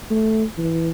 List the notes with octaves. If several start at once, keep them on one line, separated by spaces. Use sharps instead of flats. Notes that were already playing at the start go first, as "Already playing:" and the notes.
A3
E3